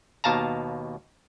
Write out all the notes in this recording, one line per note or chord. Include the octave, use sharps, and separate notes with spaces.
D#2 B2 F5 A5 A#5